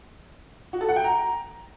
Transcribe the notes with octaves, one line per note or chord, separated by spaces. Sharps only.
F#4
A4
F#5
G5
A#5